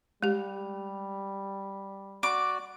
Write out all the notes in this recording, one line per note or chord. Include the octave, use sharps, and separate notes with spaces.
G3 G#3 G4
F#4 D5 D6